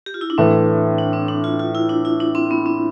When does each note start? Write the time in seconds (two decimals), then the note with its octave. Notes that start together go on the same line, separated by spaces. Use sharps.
0.06 G4
0.14 F4
0.21 E4
0.30 D4
0.38 A2 E3 A3 C4
0.99 D4
1.13 C4
1.28 D4
1.44 F4
1.59 F4
1.75 E4
1.89 D4
2.05 E4
2.20 D4
2.35 C4
2.51 B3
2.66 C4